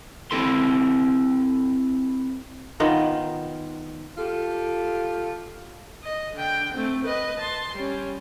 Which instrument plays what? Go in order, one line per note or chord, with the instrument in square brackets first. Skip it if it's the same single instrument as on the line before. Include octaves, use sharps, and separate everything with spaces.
[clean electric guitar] C4 E4 A4 C6
[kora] D#3 B3 F4 A#4
[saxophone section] F4 G4 A4
[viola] D#5
D3 G5
A3 C4
B4 D#5
A5 C6
G3 C#4